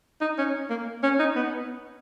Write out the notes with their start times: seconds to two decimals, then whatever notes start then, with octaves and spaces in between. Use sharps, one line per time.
0.21 D#4
0.38 C#4
0.70 A#3
1.03 C#4
1.19 D#4
1.36 B3